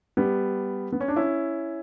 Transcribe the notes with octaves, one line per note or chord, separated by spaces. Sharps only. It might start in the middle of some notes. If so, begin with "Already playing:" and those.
G3 B3
B3
C#4
D4
C#4 E4